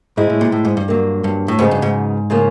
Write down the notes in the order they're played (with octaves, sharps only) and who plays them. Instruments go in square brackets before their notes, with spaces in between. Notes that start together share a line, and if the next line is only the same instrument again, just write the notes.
[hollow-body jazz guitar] G#2 [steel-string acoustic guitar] G#3 C4 E4
[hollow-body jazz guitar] A2
A#2
A2
G#2
G2
[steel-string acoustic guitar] D3 F#3 A#3
[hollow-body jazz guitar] G2
A2
[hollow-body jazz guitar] G#2 [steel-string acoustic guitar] C#3 F#3 B3 D#4
[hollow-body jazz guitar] G2
G#2
[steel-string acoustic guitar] C#3 F3 A#3 C#4